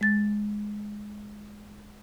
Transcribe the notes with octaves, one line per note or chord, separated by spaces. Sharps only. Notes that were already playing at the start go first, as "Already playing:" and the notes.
G#3 A6